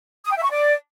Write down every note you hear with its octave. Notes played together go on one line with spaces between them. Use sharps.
D#6
G5
E5
C#6
D5